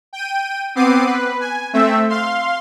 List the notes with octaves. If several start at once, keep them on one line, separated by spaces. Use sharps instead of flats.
G5 D#7
B3 C4 D6 C7 D#7
B4
G#5
A3 C4 E5
F5 C6